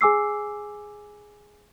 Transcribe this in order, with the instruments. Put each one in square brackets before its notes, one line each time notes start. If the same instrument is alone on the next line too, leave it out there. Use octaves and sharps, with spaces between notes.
[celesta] G#4 G#5 D6 E6 C7